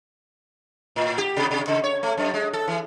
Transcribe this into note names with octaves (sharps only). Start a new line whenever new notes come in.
A2
G4
C3
C3
C#3
C#5
A3
F#2
G#3
A4
E3